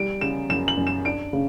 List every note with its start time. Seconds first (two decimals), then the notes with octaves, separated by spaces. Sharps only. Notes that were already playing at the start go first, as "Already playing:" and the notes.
Already playing: G3 D7
0.21 C#3 E7
0.49 F#2 E7
0.68 F#7
0.77 F#2
0.87 E7
1.05 D4 D7
1.33 C#3